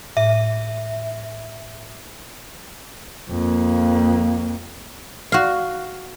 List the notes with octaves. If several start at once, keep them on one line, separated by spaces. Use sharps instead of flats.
A2 E5
F2 A#3
F#4 F5